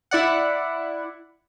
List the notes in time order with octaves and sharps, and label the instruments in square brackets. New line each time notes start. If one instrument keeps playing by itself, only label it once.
[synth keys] E4 D5 F#5